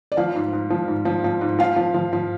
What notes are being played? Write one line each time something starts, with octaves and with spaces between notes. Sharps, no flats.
D5
F3 F5
G#2
G#2
F3
G#2
F3
F3
G#2
F3 F5
F3
F3
F3